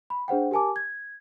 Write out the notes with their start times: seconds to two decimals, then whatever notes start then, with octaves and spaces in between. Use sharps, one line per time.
0.10 B5
0.28 D4 G#4 C5 F#5 G5
0.51 G4 A#4 G#5 A5 D6
0.76 G#6